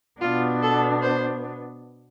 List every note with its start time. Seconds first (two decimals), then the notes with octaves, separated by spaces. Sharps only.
0.21 B2 B3 D4 F4
0.62 A4
1.02 C5